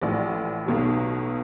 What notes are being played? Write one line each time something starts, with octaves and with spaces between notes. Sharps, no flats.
A1 A2 F3 D5
B1 B2 F#3